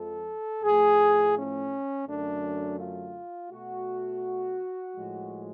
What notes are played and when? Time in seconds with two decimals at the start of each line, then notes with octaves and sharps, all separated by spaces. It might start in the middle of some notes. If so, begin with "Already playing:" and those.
Already playing: F2 F3 G#3 A4
0.63 A2 F3 A3 G#4
1.36 C#4
2.07 F#2 D3 F#3 A3 D4
2.79 F4
3.50 B2 A3 F#4
4.95 A2 F3 G#3